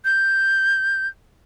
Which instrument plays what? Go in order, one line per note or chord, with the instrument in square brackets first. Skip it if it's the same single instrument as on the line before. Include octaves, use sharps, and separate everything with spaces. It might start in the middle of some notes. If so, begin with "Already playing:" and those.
[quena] G6